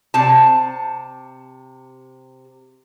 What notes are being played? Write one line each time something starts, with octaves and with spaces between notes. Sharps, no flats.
C3 A5